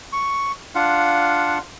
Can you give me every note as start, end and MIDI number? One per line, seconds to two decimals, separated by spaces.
0.12 0.52 85
0.75 1.58 62
0.75 1.58 65
0.75 1.58 77
0.75 1.58 78